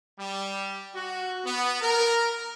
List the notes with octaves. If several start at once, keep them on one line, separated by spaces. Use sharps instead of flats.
G3
F#4
B3
A#4